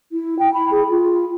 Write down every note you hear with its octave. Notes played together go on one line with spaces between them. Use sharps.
E4
G5
B5
G#4
F4